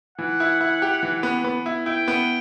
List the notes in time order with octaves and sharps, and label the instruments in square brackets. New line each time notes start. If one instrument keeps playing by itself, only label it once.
[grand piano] E3 [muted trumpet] F#5
[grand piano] E4
E4
G4
E3
B3
B3
E4
[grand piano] E4 [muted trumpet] G5
[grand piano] B3